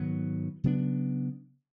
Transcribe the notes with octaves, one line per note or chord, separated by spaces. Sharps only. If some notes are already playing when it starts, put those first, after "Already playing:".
Already playing: G#2 D#3 F#3 B3
C#3 F#3 B3 D4